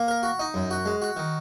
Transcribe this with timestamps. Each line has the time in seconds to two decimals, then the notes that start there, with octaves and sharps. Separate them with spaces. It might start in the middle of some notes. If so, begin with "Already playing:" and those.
Already playing: A#3
0.08 A#4
0.23 F#4
0.39 D#4
0.54 F#2
0.71 F#4
0.86 G#3
1.02 F#4
1.17 D#3